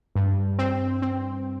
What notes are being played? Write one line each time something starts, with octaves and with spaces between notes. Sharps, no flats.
G2
C4
C4